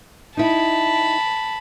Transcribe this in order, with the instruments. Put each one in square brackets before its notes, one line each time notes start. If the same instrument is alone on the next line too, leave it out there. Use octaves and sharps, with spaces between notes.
[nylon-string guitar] D#4 E4 [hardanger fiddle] A5 B5